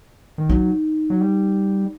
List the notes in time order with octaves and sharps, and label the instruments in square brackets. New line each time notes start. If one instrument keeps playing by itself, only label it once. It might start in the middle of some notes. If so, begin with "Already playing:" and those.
[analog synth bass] D#3
[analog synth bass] F#3 [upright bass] D#4
[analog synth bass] F#3
G3